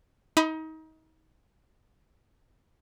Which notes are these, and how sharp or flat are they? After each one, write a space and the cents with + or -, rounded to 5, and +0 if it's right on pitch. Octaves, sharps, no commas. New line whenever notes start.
D#4 +30 B5 +0 D#6 -10